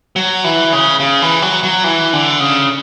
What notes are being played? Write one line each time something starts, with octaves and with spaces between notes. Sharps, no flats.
F#3
E3
C#3
C#3
E3
F#3
F#3
E3
D3
C#3